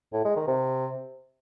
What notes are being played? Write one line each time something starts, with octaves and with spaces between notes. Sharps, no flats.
A2
G#3
D#3
C3